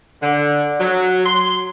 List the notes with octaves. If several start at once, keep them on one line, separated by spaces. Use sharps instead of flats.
D3
F#3
C6